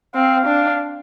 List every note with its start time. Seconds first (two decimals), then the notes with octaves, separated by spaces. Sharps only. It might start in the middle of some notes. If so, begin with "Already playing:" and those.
0.14 C4 F5
0.47 D4